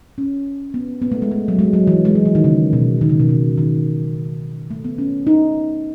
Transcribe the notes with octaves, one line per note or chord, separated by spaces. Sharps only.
C#4
B3
B3
A3
G#3
A3
F#3
G#3
F#3
E3
G#3
F#3
E3
D#3
C#3
B2
D#3
C#3
B2
C#3
D#3
A3
B3
C#4
D#4